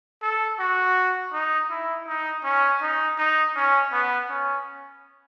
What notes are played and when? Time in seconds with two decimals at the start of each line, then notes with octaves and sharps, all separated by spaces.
0.22 A4
0.60 F#4
1.33 D#4
1.70 E4
2.07 D#4
2.44 C#4
2.82 D#4
3.18 D#4
3.56 C#4
3.92 B3
4.30 C#4